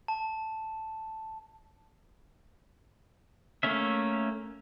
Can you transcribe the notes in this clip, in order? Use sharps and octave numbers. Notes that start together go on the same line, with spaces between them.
A5
A3 A#3 C#4 E5